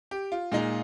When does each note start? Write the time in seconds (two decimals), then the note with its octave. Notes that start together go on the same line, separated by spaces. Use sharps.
0.11 G4
0.32 F4
0.52 A#2 G#3 D#4